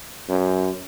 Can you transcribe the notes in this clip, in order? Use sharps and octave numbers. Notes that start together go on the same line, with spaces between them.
F#2